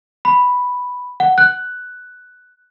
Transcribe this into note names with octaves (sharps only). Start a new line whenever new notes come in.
B5
F#5
F#6